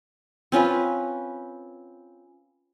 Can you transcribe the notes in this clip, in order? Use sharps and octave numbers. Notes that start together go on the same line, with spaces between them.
C4 C#4 F4 B4